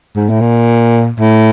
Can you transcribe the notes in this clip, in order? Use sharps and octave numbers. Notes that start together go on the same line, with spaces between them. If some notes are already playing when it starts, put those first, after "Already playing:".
G#2
A2
A#2
A2